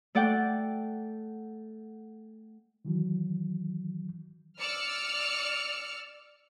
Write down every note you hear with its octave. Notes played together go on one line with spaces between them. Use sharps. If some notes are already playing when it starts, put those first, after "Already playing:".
A3 A4 D5 F#5 G5
D#3 E3 F#3
D5 E6 F6 C#7